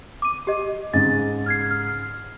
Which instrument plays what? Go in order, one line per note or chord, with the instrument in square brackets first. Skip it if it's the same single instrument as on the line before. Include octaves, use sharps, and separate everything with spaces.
[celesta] D6 D#7
G4 D#5
[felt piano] G#2 C#3 [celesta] A6
[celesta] F6 G#6 C7
F6